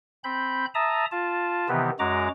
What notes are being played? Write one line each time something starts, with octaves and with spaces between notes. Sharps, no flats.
C4 B5 G6
E5 A5 A#5 D#6
F4 A5
C3 D#3 E3 B3 G4
F#2 G#3 F#4 A#5 D6